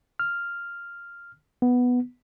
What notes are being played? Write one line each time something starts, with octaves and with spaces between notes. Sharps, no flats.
F6
B3